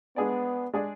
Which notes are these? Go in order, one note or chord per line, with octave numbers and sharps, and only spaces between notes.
G#3 B3 D4 G#4 D5
G#3 D4 G#4 D5